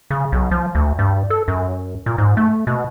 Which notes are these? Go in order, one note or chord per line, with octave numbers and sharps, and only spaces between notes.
C#3
B1
F3
D2
G2
A4
F#2
A#2
G#2
A3
B2